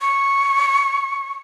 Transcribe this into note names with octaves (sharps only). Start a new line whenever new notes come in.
C#6